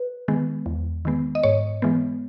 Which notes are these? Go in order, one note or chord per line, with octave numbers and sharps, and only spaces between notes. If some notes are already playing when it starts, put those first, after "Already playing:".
Already playing: B4
D#3 G#3 B3
E2
D#3 G#3 B3
D#5
G#2 C#5
E3 G#3 B3